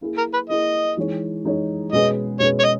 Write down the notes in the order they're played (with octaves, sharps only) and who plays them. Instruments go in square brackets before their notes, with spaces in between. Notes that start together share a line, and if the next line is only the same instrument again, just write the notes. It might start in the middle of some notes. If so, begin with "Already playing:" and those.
[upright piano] A#3 E4 G#4
[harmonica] A#4
B4
[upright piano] A#3 E4 G#4 [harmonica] D#5
[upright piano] E3 G#3 D#4 G#4 C#5
E3 G#3 D#4 G#4 C#5
[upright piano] B2 G#3 C#4 G#4 B4 [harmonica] D#5
[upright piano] B2 G#3 C#4 G#4 B4 [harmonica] C#5
[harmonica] C#5
D#5